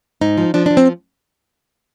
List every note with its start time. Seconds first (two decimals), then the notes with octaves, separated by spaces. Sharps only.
0.21 G#2 D#4
0.37 F3
0.54 F3 D4
0.66 F3 D4
0.77 C4